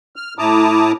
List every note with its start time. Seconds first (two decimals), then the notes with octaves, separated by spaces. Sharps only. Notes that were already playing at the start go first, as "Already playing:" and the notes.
0.16 F6
0.38 A2 E4 A5 A#5 D6 D#6